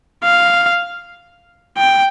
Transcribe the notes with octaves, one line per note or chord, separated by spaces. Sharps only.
F5
G5